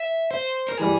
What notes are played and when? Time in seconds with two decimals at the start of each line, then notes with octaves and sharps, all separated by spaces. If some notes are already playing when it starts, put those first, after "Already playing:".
Already playing: E5
0.31 C5
0.68 A#4
0.77 E3 G3 G#4